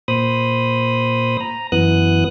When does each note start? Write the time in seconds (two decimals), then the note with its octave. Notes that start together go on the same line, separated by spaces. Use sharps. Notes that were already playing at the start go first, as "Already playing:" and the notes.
0.08 A#2 C5 B5 D#6
1.41 A#5
1.72 F#2 E3 B3 D#6 F#6